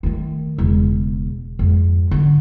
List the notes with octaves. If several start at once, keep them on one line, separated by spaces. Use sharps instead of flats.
D#3 A3
E1 C#3
F2 G#2
D3